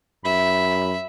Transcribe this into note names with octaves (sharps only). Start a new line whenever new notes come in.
F#2 E5 B5